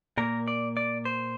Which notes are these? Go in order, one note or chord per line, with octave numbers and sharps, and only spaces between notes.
A#2 A#3 A#4
D5
D5
C5